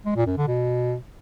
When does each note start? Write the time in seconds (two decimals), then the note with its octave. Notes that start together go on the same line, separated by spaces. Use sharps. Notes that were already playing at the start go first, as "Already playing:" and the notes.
0.06 G#3
0.16 A#2
0.27 F#2
0.37 D3
0.47 B2